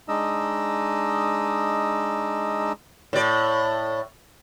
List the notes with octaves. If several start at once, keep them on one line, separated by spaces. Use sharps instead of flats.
G#3 D4 D#4 D#5 E6
A2 D5